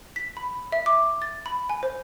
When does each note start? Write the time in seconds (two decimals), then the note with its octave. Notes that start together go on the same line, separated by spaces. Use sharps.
0.16 B6
0.37 B5
0.72 E5
0.86 D6
1.22 A6
1.46 B5
1.69 G#5
1.83 C5